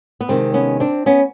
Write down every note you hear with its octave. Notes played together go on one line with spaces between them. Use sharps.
B3
C3 D#3 G#3 C4
B3 C#4
C4 D4
B3 C#4